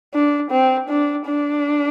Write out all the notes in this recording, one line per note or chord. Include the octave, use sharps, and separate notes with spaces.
D4
C4
D4
D4